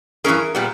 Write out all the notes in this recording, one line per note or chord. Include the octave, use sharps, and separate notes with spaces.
G2 E3 G#3 C#4 G#4 A#4
A#2 G3 B3